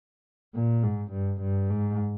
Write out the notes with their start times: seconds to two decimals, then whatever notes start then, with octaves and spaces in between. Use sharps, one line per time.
0.54 A#2
0.83 G#2
1.12 G2
1.41 G2
1.70 G#2